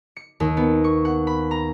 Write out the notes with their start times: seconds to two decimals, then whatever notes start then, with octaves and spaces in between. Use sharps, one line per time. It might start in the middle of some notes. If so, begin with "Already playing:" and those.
0.17 C#7
0.40 D#2
0.57 B3
0.84 C#6
1.05 F#5
1.27 B5
1.51 A#5